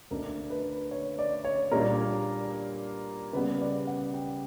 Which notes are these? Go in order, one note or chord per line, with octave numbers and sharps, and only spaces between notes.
D2 D3 A#3 D4 A#4
B4
C#5
D5
C#5
A#2 G3 A#3 D4 A#4
C#3 G3 B3 B4
D5
F#5
G5